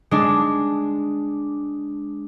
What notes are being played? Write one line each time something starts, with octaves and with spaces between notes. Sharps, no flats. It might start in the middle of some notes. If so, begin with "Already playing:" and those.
G#3 D4